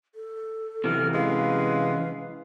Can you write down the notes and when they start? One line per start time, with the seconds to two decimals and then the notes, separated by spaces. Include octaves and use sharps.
0.15 A4
0.84 C3 E3 F#3 F6
1.14 G#3 C#4 B4 F5